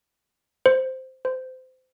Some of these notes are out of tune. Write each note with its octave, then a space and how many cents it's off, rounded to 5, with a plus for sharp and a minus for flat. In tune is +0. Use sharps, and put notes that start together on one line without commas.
C5 -5
C5 -25